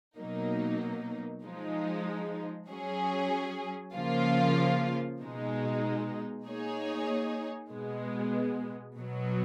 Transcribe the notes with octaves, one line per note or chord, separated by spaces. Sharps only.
B2 F#3 A#3 D#4
F3 G#3 D#4
F#3 C#4 G#4
C#3 F3 A#3 F4
B2 G#3 D#4
A#3 D#4 G#4 C#5
B2 G#3 B3
B2 F#3 B3